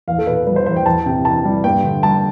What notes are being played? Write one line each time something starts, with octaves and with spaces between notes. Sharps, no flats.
E2 F5
A4
B2 B4
G3 B4
C5
E2 C5
G5
E2 A5
C3 G5
E3 A5
G3
G2 G5
D3
G3 A5